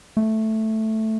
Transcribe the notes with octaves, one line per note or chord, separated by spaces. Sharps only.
A3